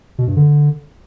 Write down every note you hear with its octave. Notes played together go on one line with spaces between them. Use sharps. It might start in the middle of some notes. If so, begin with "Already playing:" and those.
B2
G2
D3